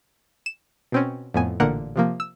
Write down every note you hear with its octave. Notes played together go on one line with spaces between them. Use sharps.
E7
B2 C4 C#4
F2 A2 B3 G#5
A1 A#2 D3 A#3 A#4 F#5
C3 F3 A#3
E6